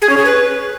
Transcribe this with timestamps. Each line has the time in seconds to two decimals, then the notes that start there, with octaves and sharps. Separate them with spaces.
0.02 G#4
0.10 C#4
0.17 G#4
0.25 B4